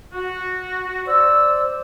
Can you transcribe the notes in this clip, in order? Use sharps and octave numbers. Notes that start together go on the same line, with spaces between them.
F#4
C5 D5 E6